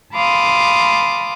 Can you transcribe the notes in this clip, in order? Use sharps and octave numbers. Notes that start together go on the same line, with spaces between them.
F5 A5 B5 C6 D6 D#6